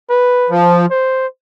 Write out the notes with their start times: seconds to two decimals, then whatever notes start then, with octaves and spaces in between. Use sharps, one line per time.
0.10 B4
0.50 F3
0.90 C5